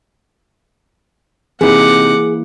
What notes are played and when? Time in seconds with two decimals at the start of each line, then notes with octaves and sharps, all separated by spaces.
1.61 C3 E3 A#3 D#4 E4 G#4 F#5 D6